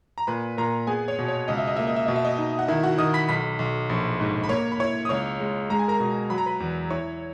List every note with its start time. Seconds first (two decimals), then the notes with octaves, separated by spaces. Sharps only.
0.18 A#5
0.27 A#2 B4 B5
0.58 A#2 A#4 A#5
0.87 B3 G#4 G#5
1.08 C#5
1.19 B2
1.28 C#5
1.48 C#2 D#5
1.58 E5
1.67 D#5
1.76 A#3 E5
1.87 D#5
1.96 E5
2.06 B2 D#5
2.16 E5
2.25 D#5
2.38 D#4
2.59 F#5
2.68 D#3 E4 E5
2.83 F#4 F#5
2.98 D#3 D#5 D#6
3.14 B5 B6
3.28 B1 B5 B6
3.59 B1
3.89 A#1
4.20 G#2
4.44 B5
4.49 A#3 C#5 C#6
4.72 B5
4.80 E4 C#5 C#6
5.05 D#6
5.09 C#2 C#5 C#6
5.40 G#3
5.70 G#3 A#5
5.79 G#5
5.88 A#4 A#5
6.00 B2
6.30 F#3 B5
6.38 A#5
6.46 B4 B5
6.60 E2
6.90 E4 C#5 C#6